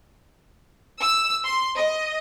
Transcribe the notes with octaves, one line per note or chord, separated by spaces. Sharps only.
E6
C6
D#5